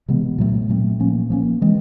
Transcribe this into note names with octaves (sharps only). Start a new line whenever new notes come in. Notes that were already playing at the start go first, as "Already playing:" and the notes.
C3 E3 G#3 B3
A#2 F#3 A3 C4
A#2 F#3 A3 C4
F3 A#3 C#4
F3 A#3 C#4
E3 G#3 C4